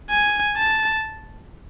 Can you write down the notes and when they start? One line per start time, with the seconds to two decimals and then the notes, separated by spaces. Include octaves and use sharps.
0.10 G#5
0.57 A5